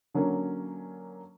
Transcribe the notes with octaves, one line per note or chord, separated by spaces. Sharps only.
D3 F#3 A#3 C#4